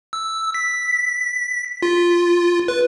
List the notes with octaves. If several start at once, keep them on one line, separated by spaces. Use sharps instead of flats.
E6
B6
F4
B4